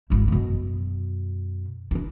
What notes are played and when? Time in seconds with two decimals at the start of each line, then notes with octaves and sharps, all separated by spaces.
0.10 G#1 E4
0.28 F#2 B2
1.91 D4 E4